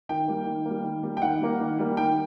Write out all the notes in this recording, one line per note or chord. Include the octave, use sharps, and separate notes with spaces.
D#3 G5
G3 A#3
D#3
G3 A#3
D#3
G3 A#3
G5
D#3 F#5
G3 A#3
D#3
G3 A#3
D#3 G5